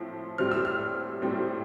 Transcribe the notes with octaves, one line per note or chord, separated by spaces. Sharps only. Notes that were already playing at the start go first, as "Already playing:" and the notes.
Already playing: A2 F3 C4
A2 G3 C4 F6
E6
F6
A2 G3 C4